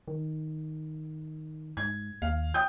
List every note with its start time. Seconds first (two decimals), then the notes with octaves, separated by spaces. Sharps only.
0.08 D#3
1.77 G#2 G#6
2.22 D#2 F5
2.54 G5 D#6 G6